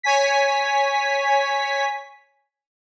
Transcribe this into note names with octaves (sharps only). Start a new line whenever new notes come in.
C#5 G#5 B6